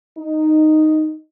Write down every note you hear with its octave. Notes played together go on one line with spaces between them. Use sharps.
D#4